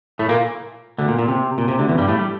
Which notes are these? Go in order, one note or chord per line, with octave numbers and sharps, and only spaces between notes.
A2 A3
A#2 A#3
D2 D3
A#2
A#2
C3
A#2
C3
D2 D3
E2 E3
G2 G3
A2 A3
G3